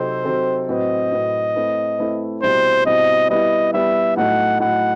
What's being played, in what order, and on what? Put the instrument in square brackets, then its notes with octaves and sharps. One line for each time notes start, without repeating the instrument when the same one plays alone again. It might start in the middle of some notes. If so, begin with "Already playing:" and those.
Already playing: [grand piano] C3 F#3 C4 D#4 A4 [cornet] C5
[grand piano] C3 F#3 C4 D#4 A4
[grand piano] A2 F#3 C4 F#4 B4 [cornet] D#5
[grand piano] A2 F#3 C4 F#4 B4
A3 C4 E4 B4
A3 C4 E4 B4
[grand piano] B2 G3 C4 E4 [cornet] C5
[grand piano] B2 G3 C4 E4 [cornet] D#5
[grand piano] G3 B3 E4 [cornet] D#5
[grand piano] G3 B3 E4 [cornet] E5
[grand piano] A2 F#3 A3 D#4 [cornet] F#5
[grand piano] A2 F#3 A3 D#4 [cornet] F#5